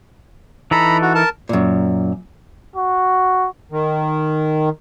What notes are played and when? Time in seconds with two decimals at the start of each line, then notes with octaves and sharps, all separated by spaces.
0.71 E3 D#4 A4 A#5 B5
1.02 F#4
1.15 A#4 A5
1.49 F#2 A#2
2.76 F#4
3.72 D#3